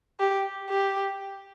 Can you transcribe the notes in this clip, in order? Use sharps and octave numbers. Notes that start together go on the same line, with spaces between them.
G4
G4